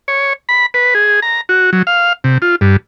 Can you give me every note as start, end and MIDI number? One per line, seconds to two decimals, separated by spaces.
0.08 0.33 73
0.49 0.66 83
0.74 0.94 71
0.95 1.20 68
1.22 1.41 82
1.49 1.70 66
1.73 1.82 54
1.87 2.13 77
2.24 2.38 48
2.42 2.56 65
2.61 2.76 43